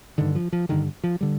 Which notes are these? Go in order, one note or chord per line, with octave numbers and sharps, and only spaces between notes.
G2 D3 D#3
F3
F3
G2 D3 D#3
F3
D3 G3